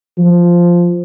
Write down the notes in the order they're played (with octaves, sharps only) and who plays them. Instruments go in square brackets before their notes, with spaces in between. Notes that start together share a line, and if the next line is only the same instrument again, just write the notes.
[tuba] F3